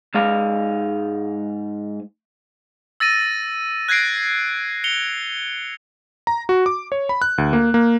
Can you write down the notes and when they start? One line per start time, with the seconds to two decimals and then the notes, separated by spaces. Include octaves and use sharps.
0.15 G#2 G#3 F5
3.00 E6 A6 A#6 D#7
3.88 F#6 G#6 A#6 C7 D7
4.84 C#7 F7 G7
6.27 A#5
6.49 F#4
6.66 D6
6.92 C#5
7.09 B5
7.22 F#6
7.38 D2
7.53 A#3
7.74 A#3